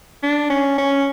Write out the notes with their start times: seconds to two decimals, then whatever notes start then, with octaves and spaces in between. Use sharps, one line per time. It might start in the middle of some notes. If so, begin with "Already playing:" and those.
0.23 D4
0.50 C#4
0.78 C#4